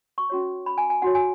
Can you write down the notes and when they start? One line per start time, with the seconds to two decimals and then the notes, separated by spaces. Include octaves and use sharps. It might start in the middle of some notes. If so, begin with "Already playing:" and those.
0.18 C#6
0.30 C#4 F#4 C#5
0.66 B5
0.78 G#5
0.90 G#5
1.02 D#4 F#4 C#5 F#5
1.15 G#5